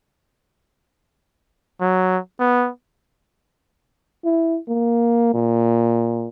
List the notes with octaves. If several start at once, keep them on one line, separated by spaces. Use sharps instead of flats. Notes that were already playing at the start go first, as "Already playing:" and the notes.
F#3
B3
E4
A#3
A#2